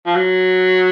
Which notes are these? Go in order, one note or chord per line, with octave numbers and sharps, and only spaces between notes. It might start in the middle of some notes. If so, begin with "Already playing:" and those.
F3
F#3